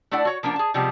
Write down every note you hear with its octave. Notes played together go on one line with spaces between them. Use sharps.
A3 D4 E4 D5 F#5
F#4 C#5
F3 A#3 B3 D4
G#4 A5
C3 F3 G3 G#3 B3